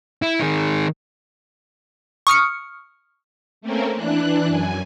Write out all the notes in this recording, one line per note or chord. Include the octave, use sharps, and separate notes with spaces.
E4
D#3 G#4
C#6 D#6 F6 C#7
A3 A#3 C4 C#4 A#4
E3 D4 F#6
F#2 G#5